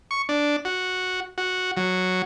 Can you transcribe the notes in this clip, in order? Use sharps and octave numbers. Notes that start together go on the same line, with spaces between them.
C#6
D4
F#4
F#4
F#3